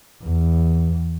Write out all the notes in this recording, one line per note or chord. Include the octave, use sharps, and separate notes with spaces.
E2